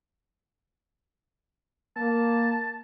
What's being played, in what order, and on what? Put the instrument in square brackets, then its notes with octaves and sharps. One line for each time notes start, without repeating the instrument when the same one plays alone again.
[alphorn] A#3 [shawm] A5